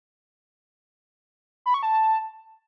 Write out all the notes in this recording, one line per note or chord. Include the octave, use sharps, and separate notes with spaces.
B5
C#6
A5